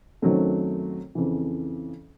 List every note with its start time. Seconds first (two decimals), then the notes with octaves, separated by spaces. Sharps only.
0.22 F#2 D#3 F#3 A3 C4
1.15 F2 C#3 E3